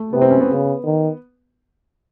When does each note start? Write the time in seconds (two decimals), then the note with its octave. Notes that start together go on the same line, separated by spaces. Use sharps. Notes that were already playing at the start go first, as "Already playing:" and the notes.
Already playing: A3
0.13 C3 B3
0.21 C4
0.31 C#4
0.40 B3
0.49 C#3
0.85 D#3